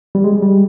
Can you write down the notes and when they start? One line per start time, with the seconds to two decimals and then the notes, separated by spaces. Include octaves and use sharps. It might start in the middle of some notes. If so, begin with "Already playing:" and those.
0.15 G3
0.24 G#3
0.42 G3